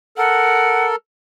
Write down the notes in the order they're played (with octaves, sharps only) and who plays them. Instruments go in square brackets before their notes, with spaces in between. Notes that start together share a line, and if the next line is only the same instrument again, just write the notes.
[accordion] A4 A#4 [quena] F#5